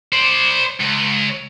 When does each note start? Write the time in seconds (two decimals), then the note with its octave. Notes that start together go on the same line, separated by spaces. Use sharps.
0.12 C5 D5
0.80 C#2